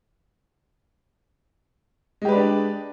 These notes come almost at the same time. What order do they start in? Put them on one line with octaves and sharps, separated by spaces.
G#3 G4 B4 D5 D4